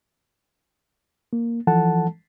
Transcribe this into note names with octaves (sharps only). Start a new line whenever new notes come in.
A#3
E3 F3 A4 F#5 A5